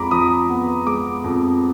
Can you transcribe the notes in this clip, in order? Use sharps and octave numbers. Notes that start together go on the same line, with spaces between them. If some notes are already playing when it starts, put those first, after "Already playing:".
Already playing: F2 G#3 A#5 B5 D6
F3 D#6
B3
G#3 D6
F2